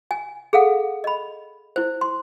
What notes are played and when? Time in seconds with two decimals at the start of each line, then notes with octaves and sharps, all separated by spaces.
0.11 G#5
0.53 G#4 A4 F5 F#5
1.04 D#5 B5
1.76 E4 C5
2.01 C6